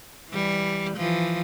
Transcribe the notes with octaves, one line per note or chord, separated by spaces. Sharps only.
E3 G3
E3 F3